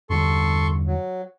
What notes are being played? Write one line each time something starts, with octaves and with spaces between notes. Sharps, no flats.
E2 G2 D3 A4 C6 C#6
F#3